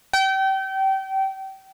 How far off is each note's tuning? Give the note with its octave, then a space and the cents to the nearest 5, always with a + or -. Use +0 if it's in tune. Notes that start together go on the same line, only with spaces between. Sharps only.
G5 -30